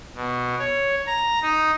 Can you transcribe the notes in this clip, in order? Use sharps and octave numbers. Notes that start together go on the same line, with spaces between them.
B2
C#5
A#5
D#4